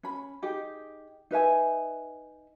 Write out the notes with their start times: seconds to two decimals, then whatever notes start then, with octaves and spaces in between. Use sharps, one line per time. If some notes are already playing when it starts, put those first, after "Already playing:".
0.03 C#4 B5
0.42 D#4 G4 G#4 G5
1.31 D#4 B4 E5 G#5